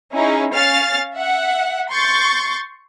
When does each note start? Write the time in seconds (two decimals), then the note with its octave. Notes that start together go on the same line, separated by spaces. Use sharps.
0.13 C#4 D#4 E4 G#4
0.53 C#4 F5 F6 A6 C7
1.14 E5 F#5
1.91 C6 C#6 G6 A6